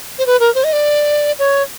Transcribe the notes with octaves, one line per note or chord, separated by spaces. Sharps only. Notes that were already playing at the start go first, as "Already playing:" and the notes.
C5
B4
A#4
C5
D#5
D5
C#5